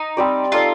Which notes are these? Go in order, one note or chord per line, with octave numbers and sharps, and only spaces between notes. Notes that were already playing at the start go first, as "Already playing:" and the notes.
Already playing: D#4
G3 C4 G4 D5
D#4 F4 A4 D5 F5